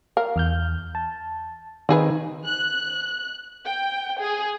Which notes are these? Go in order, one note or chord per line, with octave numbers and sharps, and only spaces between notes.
A#4 F5
E2 F6 G6
A5
D#3 C4 G#4 B4
F#6
G5
G#4